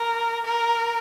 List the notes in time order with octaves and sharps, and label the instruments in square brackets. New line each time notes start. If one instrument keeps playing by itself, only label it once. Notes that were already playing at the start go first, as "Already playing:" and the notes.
Already playing: [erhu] A#4
A#4